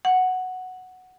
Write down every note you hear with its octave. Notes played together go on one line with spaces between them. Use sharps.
F#5